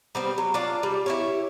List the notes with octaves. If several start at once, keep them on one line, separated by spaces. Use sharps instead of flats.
G3 B3 C4
F#3
D4 F4 D5
G3
E4 G4 C#5